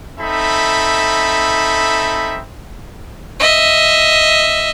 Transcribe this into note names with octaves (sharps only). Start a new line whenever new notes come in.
C4 D#4 A4 E5 B5
D#5 E5